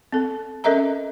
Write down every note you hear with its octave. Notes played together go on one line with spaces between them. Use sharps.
C4 A4
C#4 A4 A#4 D#5 E5 A#5